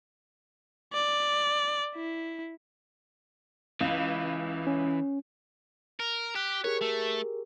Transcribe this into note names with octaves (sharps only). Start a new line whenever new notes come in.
D5
E4
C#2 E3
C#4
A#4
G4 F#6 B6
G4 G#4 A#4 C#5
A3